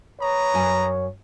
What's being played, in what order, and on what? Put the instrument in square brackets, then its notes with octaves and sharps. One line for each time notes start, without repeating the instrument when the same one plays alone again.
[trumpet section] B4 A#5 D#6 [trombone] C#5
[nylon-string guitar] F#2 G#5